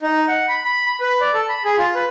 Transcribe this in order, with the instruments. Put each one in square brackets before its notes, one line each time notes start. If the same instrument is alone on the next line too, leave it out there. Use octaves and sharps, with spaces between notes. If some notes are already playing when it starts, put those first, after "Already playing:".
[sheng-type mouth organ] D#4
F#5
B5
B5
B5
B4
D5
A4
B5
G#4
F4
B4